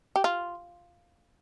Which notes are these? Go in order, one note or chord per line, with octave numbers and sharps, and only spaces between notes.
G4
F4